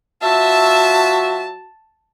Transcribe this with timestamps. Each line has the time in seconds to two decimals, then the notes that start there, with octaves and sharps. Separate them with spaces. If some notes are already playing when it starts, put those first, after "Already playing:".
0.23 F#3 F4 F#4 E5 A5